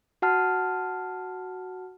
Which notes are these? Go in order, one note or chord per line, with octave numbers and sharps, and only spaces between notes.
F#4 F#5 A5 F6